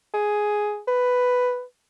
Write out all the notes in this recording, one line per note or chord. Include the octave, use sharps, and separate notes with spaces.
G#4
B4